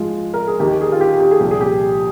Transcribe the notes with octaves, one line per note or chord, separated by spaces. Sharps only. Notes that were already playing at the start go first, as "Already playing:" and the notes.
Already playing: G#2 F3 G#3 F4
A#4
G#4
D#2 D#3 A#3 G4
G#4
F4
G4
G4
G#4
C2 A#2 F3 G4
G#4
G4